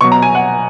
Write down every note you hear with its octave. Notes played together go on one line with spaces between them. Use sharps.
B2 F#3 C#6
A#5
G#5
F#5